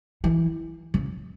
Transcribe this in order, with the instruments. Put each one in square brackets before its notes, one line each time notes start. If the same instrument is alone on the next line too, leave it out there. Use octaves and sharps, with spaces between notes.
[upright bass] E3
C#3